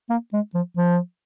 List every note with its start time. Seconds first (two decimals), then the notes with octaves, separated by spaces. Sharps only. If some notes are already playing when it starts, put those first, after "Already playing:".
0.10 A#3
0.33 G#3
0.55 F3
0.77 F3